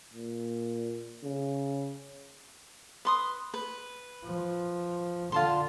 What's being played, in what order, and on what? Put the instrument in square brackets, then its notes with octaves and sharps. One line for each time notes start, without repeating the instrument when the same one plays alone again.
[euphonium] A#2
C#3
[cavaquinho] B4 C6 D#6
B4
[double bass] F3
[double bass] D3 [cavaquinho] F4 A5 C6